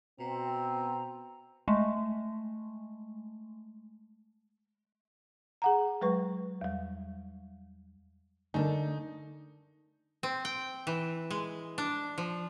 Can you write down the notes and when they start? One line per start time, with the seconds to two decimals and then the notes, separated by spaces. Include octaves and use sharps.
0.19 B2 C4 A#5
1.68 G#3 A3
5.62 G#4 F#5 A#5
6.01 F#3 G#3 B4 C#6
6.61 E2 G3
8.54 D3 A3 D4 D#4 A#4
10.23 C4
10.45 G5
10.87 E3
11.30 G#3
11.78 D4
12.18 F3